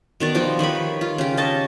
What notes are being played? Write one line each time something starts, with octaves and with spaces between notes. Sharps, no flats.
B2 D#3 D5
F3 G3 D#4 D6
D#3 B4 C#5 B5
F4
C#3 G4
D#5 A5 C#6